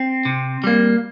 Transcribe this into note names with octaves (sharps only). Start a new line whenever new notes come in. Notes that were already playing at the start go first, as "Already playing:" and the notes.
Already playing: C4
C3
G3 A#3